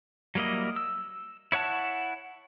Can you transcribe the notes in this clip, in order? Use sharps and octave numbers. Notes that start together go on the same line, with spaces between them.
F#3 G3 A#3 E4 D#5
E6
E4 C#5 F#5 A5